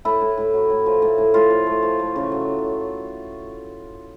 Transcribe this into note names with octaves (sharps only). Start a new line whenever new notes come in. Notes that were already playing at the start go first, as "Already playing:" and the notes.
A2 E4
A2
A2
F#3
A2
F3
A2
A2
A2 F4
F3
A3
F3
A3
C#3
F#3